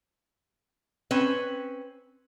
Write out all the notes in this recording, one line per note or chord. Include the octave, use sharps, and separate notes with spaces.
C4 C#4 B4